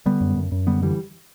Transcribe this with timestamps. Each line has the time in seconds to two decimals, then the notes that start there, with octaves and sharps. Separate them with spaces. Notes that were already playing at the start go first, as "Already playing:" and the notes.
0.06 D3 G3 B3
0.21 F#2
0.36 F#2
0.52 F#2
0.67 D3 G3 B3
0.82 D3 E3 G3